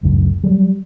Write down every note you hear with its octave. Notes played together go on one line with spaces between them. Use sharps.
F#1 C#2 F#2 A2
F#3 G3